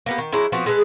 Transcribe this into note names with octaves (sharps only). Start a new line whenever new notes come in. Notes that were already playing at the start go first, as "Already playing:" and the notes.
A#3 B3 G4
D#3
F#3 G#3 E4 C5
F3 B3 C4 F#4
G#3 G#4 A4 B4